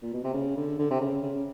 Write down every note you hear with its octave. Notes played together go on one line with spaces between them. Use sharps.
A#2
B2
C3
C#3
D3
D3
C3
C#3
C#3